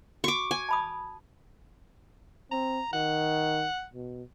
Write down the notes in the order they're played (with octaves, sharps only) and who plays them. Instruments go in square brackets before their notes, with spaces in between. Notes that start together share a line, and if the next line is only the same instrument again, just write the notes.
[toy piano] F#4 [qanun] C#6 D6
[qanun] G#5
[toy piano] A5 B5 D#6
[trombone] C4 [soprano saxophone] A#5
[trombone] D#3 [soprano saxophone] F#5
[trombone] B2